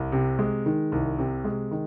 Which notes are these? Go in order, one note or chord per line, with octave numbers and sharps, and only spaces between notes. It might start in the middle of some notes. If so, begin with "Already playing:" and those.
Already playing: C2
C3
G#3
D#3
C2
C3
G#3
D#3